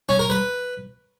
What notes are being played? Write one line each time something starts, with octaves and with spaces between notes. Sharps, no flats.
C#4
A#4
B4